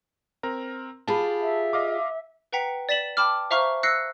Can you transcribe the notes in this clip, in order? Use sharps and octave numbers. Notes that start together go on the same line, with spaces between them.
C4 A#4 A#5
F4 G4 G#4 A5 B5
E5
D#5 F5 D6
B4 F#5 G5 A#5 B6 C#7
D5 A6 B6 E7 F#7
G5 A5 B5 D6 F6
C5 E5 F5 A#5 C#6 F6
E6 F#6 A#6 C7 C#7